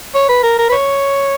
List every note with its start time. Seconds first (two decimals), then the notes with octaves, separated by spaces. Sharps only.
0.15 C#5
0.29 B4
0.43 A#4
0.58 A#4
0.69 B4
0.72 C#5